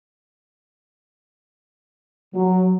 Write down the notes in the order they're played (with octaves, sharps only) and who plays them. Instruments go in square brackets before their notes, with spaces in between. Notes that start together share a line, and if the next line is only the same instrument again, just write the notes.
[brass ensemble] F#3